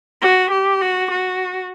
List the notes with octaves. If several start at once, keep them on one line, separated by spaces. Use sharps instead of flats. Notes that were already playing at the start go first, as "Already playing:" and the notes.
F#4
G4
F#4
F#4